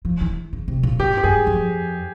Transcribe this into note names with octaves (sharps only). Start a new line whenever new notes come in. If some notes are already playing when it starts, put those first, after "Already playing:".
F3
E3
C#3
C3
A#2
G#2 G4
G4
G2 G#4
F2